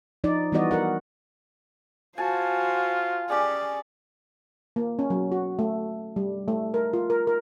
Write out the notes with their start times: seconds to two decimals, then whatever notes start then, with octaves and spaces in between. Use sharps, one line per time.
0.24 F3 D#4 D5
0.52 E3 G3 B3 F#4 D5 D#5
0.71 F#4 A#4 F#5
2.18 F4 F#4 C5 G#5 A5
3.30 C#4 G4 G#4 D5
4.76 A#3
4.99 C#4
5.10 F#3
5.32 F#4
5.59 A3
6.16 G3
6.48 A3
6.74 A#4
6.93 F4
7.10 A#4
7.27 A#4